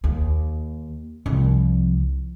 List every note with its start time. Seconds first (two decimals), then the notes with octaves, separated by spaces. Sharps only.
0.04 D#2
1.26 C2 F3